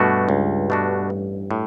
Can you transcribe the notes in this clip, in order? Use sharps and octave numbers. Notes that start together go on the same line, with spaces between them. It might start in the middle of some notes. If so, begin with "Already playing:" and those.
Already playing: G2 B2 A3 D4 F#4
C#2
B2 A3 D4 F#4
A1
A2